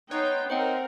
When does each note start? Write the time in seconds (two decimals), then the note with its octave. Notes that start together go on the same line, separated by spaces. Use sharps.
0.11 B3 D#4 C#5 G5 C6
0.50 C4 D#4 A#4 C5 F#5 G5